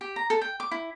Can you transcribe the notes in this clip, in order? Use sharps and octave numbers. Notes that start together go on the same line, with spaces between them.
G4
A#5
A4
G5
D6
E4